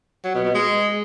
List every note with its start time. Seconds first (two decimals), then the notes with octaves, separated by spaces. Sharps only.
0.24 F#3
0.34 B2
0.45 B2
0.55 G#3